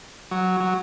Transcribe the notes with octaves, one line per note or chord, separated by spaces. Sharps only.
F#3
F#3